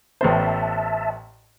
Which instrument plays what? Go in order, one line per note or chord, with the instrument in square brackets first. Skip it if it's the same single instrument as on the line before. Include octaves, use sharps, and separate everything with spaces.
[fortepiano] A1 B3 C5 [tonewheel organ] E5 A5